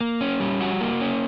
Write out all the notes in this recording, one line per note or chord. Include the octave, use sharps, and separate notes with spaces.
A#3
C#4
G3
F#4
A#3
C#4